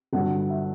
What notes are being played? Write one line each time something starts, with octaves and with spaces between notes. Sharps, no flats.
G1 G2 D3 F#3 F#5
E5